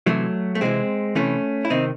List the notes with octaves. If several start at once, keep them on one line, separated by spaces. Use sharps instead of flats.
C3 E3 F#3 A3
A3
C3 E3 G#3 C4
C3 E3 A3 C#4
E4
C3 D#3 C4 D#4